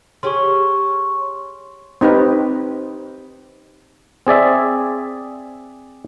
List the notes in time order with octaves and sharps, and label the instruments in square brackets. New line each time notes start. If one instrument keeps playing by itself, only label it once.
[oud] C#4 G4 G#4 [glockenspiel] C6 C#6
[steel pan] C4 D#4 G4 B4
[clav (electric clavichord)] C4 G#4 D5 E5